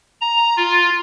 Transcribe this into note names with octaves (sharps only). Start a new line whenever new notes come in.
A#5
F4